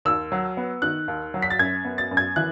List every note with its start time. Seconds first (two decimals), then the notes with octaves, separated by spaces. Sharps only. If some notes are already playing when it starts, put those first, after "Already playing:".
0.05 D#2 E6
0.32 F#3
0.57 B3
0.82 D#3 F#6
1.08 D#2
1.34 F#3
1.42 B6
1.50 A6
1.59 F#2 G#6
1.85 B3
1.98 A6
2.11 F#2
2.17 G#6
2.36 E3 F#6